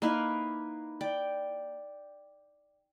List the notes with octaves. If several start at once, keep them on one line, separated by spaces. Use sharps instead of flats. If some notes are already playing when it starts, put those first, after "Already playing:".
A#3 D#4 E4 B4
D5 G5